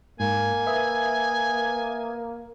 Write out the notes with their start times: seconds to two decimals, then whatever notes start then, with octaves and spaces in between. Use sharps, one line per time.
0.20 G#2 A#3 G#5
0.67 B4 E5 D#6